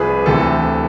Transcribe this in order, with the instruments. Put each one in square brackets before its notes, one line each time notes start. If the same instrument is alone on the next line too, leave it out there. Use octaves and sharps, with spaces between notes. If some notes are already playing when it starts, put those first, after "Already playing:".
Already playing: [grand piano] C2 C3 F3 G#4 B4
D2 C3 E3 A4